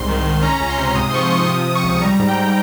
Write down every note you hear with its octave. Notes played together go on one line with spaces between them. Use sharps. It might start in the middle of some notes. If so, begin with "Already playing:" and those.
Already playing: C2 G#2 C6
D#3
D#3
C#4 A#5
C#2
C6
C3
G#2 D#6
C6
F3 C#6
D#6
F3 C#6
C3 D#6
C3 D#6
C#6
C#2
G3 A#5
G#2
G5
G#2